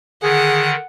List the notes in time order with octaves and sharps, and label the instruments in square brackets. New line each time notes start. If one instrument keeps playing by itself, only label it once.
[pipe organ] D3 D#3 [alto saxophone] G#4 [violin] F#5